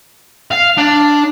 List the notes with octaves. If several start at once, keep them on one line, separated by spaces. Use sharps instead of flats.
F5
D4